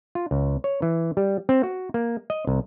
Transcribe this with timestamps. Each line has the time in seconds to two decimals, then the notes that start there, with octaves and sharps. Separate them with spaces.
0.15 F4
0.31 C#2
0.64 C#5
0.82 E3
1.17 G3
1.49 C4
1.63 F#4
1.94 A#3
2.30 D#5
2.47 C2